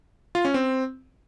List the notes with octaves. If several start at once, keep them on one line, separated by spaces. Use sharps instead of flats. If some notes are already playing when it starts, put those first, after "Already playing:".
F4
C#4
C4